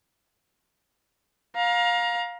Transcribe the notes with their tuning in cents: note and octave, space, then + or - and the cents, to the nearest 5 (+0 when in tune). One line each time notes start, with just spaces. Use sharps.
F5 +20 A#5 +25